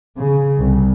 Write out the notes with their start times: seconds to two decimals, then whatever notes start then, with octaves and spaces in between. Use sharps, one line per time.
0.17 C#3
0.59 C2